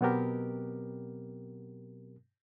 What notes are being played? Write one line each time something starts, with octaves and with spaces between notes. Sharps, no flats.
B2 F#3 B3 C4 G4 A#4